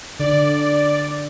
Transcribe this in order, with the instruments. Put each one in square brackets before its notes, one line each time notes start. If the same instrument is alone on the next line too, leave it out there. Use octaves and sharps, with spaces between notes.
[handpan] D3 [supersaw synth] D5